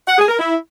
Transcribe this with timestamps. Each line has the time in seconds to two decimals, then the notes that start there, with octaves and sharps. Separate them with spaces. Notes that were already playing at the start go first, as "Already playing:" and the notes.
0.08 F#5
0.18 G#4
0.28 A#4
0.39 E4